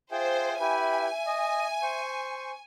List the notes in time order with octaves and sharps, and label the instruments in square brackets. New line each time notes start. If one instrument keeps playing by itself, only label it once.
[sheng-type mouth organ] F4 G#4 G5 [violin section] C5 [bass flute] E5
[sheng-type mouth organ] E4 G4 B4 [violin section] G#5
[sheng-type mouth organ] D#5
C5 C#6